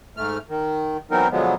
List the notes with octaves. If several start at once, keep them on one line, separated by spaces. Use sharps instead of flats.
G#2 A3 F6
D#3
E3 F#3 B3 C4 D#4 A#4
B2 D3 F3 F#3 G#3 B3